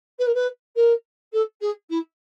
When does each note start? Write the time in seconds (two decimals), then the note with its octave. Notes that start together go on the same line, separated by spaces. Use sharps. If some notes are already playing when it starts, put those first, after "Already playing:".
0.19 B4
0.26 A#4
0.34 B4
0.75 A#4
1.32 A4
1.61 G#4
1.89 E4